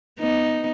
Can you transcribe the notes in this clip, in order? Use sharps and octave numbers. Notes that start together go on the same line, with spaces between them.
B3 D#4